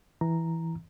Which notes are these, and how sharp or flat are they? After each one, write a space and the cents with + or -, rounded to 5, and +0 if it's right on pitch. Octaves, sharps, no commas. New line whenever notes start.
E3 +0 A#5 +0